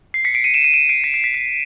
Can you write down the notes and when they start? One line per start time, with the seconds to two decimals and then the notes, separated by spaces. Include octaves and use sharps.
0.14 C7
0.24 B6 C#7
0.34 C7 D7
0.44 C#7 D#7
0.54 D7 E7
0.64 C#7 D#7
0.74 D7 E7
0.89 C7 D7
1.04 B6 C#7
1.14 C7
1.24 B6
1.34 C7